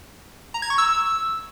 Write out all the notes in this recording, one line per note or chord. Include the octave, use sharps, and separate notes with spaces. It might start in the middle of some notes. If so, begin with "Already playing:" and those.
A#5
G#6
C#6
E6